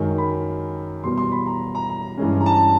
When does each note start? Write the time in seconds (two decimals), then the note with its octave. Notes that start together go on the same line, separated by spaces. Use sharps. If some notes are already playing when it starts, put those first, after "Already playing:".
Already playing: F#2 D#3 G#3
0.18 B5
1.04 E2 B2 G3 B3 C6
1.18 C6
1.32 B5
1.46 A#5
1.75 A#5
1.89 A#5
2.18 G2 E3 G#3 C#4
2.41 A#5
2.46 A5